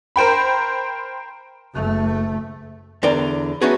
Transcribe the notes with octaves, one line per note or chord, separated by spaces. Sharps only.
A#4 C5 G5 B5
F#1 A3
E2 D3 A#4 D5 G5
A3 B3 C#4 D#4 F#4 G#4